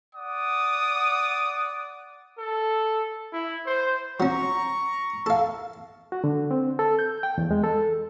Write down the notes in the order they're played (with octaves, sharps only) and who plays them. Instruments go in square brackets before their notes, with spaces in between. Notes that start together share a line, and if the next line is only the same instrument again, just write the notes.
[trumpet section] D5 F#5 D#6
[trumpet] A4
E4
C5
[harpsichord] F#3 C#4 [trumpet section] A#5 C#6
[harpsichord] A4 F5
[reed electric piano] F#4
D3
C4
A4
G6
G5
E2
G#3
A4